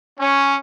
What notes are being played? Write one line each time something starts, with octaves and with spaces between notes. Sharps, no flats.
C#4